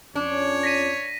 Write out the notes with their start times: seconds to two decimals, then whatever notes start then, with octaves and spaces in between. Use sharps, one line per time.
0.15 F2 C#4 D4 C#5
0.63 A#6 B6 D#7